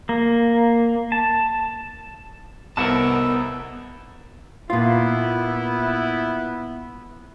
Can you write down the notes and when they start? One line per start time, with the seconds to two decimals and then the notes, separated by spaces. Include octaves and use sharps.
0.09 A#3
1.12 A5
2.77 C2 B3 D#4 E4 A4 A#4 F#5 A5
4.70 A#2 B3 E4 F4